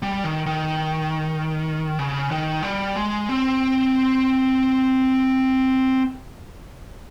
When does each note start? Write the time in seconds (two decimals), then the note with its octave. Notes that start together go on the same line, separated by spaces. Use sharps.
0.02 G3
0.24 D#3
0.46 D#3
1.99 C#3
2.31 D#3
2.63 G3
2.96 G#3
3.29 C4